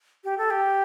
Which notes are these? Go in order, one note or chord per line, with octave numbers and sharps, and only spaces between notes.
G4
A4
G4